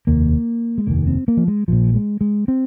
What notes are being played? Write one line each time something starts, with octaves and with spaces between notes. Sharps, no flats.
F1 D#2 A#3
G#3
F1 D#2 A#3
C4
A#3
F3
G#3
A#1 A#2 F3
G#3
G#3
C4